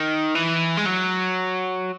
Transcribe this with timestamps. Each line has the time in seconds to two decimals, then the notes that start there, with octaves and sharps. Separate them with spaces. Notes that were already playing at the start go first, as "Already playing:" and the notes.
Already playing: D#3
0.35 E3
0.78 G#3
0.86 F#3